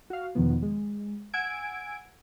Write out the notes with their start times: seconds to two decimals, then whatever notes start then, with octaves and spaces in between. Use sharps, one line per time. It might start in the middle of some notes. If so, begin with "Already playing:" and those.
0.10 F#4 F5
0.35 E2 B2 D#3 F3 B3
0.62 G#3
1.33 F#5 G#5 E6 G#6 D7